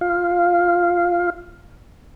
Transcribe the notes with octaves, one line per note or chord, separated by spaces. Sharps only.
F4 F5